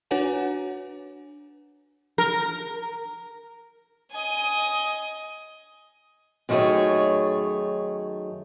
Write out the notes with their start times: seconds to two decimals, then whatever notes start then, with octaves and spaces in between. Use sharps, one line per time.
0.11 D4 F#4 B4 C#5 F#5 G#5
2.18 A#4
4.12 D#5 G#5
6.49 F#2 D#3 A3 F4 G#4 C#5